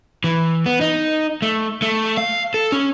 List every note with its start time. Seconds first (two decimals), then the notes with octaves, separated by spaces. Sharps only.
0.24 E3
0.66 B3
0.81 D#4
1.42 A3
1.82 A3
2.17 F5
2.54 A4
2.72 C#4